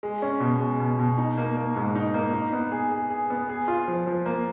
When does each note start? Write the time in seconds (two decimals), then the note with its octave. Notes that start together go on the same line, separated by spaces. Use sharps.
0.03 G#3
0.22 C#4
0.40 B2
0.60 G#3
0.80 B2
0.99 B2
1.18 D#4
1.37 A#3
1.57 A#3
1.76 G#2
1.95 D#4
2.14 A#3
2.33 D#4
2.53 B3
2.72 G#4
2.92 G#4
3.10 G#4
3.30 B3
3.49 G#4
3.68 F4
3.88 F3
4.07 F3
4.26 A#3